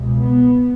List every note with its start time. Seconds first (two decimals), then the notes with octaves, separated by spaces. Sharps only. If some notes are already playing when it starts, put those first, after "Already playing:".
Already playing: C#2 B2
0.19 B3